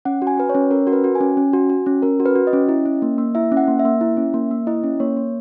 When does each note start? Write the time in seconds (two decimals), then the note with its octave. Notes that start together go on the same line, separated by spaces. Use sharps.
0.05 C#4 F#5
0.22 F#4
0.27 G#5
0.38 F#4 B4
0.49 C#5
0.55 C#4
0.71 C#4 A#4
0.87 F#4 A#4
0.93 B4
1.04 F#4
1.15 G#5
1.21 C#4
1.37 C#4
1.53 F#4
1.70 F#4
1.86 C#4
2.02 C#4 A#4
2.20 F#4
2.25 B4
2.35 F#4
2.47 D#5
2.53 C#4
2.69 E4
2.86 C#4
3.02 A#3
3.18 A#3
3.35 E4 E5
3.52 C#4
3.57 F#5
3.68 A#3
3.79 E5
3.85 A#3
4.01 E4
4.17 C#4
4.34 A#3
4.51 A#3
4.67 E4 D#5
4.84 C#4
5.00 A#3 C#5
5.17 A#3